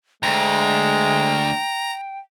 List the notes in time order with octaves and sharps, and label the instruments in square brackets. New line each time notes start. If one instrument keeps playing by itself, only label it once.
[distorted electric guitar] D2 [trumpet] G#3 [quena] G5 [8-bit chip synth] A#5